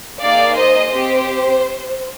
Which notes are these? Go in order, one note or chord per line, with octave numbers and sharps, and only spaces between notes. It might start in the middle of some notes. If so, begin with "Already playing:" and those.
A#3 D#4 G#4 D5 F5
C5 D#5
C4 G4 C5